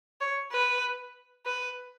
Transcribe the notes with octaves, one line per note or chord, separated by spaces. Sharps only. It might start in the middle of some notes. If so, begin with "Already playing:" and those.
C#5
B4
B4